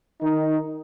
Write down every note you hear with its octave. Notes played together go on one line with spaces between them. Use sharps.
D#3 D#4